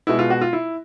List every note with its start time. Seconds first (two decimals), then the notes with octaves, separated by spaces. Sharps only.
0.07 B2 G#3 B3 E4
0.19 F4
0.30 F#4
0.42 F4
0.53 E4